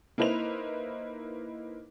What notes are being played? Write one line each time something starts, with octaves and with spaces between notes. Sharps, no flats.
A#3 D#4 E4 B4 C5 F7